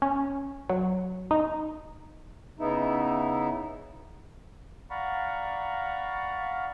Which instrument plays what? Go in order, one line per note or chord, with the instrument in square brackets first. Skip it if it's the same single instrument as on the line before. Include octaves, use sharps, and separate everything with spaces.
[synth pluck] C#4
F#3
D#4
[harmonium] C#3 B3 D#4 E4
[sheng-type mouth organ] D5 F5 F#5 A#5 B5 C#6